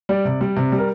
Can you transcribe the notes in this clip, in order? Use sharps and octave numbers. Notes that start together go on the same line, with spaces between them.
G3 D5
C3
G3
C3
G3
A#4